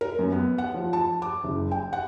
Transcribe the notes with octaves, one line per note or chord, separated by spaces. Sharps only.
A#4
F#2
B3
F#5
F3
A5
D6
F#1
G5
F#5